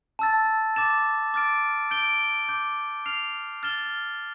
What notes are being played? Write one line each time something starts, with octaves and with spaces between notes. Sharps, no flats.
A5 E6 A6
D6 A6 E7
D6 F6 A6 D7
G6 D7 G7
D6 G6 D7
F6 C7 F7
F6 A6 E7 G7